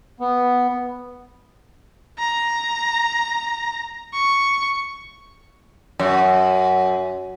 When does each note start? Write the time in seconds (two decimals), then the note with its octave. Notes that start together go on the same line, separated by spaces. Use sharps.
0.20 B3
2.19 A#5
4.13 C#6
5.99 F#2